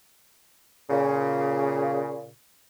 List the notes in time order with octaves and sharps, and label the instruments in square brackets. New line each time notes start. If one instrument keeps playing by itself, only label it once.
[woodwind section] A#2 C#3